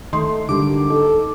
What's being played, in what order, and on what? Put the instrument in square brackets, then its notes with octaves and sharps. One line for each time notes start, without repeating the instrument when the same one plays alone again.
[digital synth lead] D#3 [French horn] A3 [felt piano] C6
[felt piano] D3 G3 [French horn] D#3 [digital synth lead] D6
[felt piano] D#4 [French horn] A4